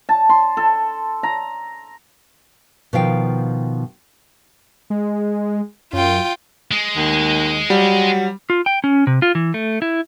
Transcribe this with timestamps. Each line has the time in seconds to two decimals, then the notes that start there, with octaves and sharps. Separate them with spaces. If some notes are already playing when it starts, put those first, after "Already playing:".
0.09 A5
0.29 C6
0.57 A4
1.23 A#5
2.93 B2 D#3 F3 F4 F5 G5
4.90 G#3
5.93 F#2 F4 G5
6.71 G#3
6.96 D#2
7.70 F#3 G3
8.50 F4
8.66 G5
8.84 C#4
9.07 C3
9.22 F4
9.35 E3
9.54 A3
9.82 E4